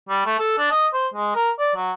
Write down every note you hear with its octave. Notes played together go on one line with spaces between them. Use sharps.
G3
A3
A4
D4
D#5
C5
G#3
A#4
D5
F#3